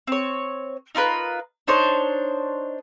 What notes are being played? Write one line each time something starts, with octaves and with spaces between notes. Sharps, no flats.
C4 C#5
D#4 F4 A#4 B4
D4 D#4 C5 C#5